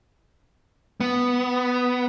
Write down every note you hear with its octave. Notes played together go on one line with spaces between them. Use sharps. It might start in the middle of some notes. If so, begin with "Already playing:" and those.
B3